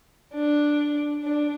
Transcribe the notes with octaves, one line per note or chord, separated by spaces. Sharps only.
D4
D4